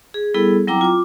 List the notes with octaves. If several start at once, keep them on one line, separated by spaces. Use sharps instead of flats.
G#4
G3 B3 E4 G#4 A4
F#3 C4 E4 G5 A#5 D6
F4 D6